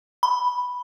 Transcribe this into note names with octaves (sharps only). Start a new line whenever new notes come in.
B5